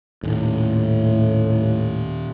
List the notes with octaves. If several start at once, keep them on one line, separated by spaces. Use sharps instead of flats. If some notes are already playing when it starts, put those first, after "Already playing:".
D#1 A2